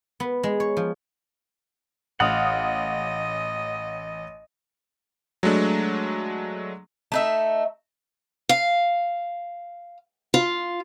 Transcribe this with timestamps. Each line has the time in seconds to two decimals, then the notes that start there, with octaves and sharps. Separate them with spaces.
0.20 B3
0.43 G#3
0.60 C#5
0.77 F3
2.20 A1 D#5 F5 F#5 D#6
5.43 F#3 G#3 A3 D4
7.12 A3 D#4 E5
8.49 F5
10.34 F4